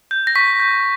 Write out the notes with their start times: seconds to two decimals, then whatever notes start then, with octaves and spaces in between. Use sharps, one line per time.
0.11 G6
0.27 A#6
0.35 C#6 B6
0.60 G6